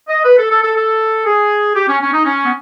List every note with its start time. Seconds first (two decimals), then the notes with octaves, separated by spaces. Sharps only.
0.09 D#5
0.25 B4
0.39 A4
0.51 A4
0.63 A4
0.76 A4
1.26 G#4
1.76 G4
1.88 C#4
2.01 C#4
2.13 D#4
2.25 C#4
2.45 B3